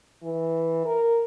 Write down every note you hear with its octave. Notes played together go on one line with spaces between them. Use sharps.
E3
A#4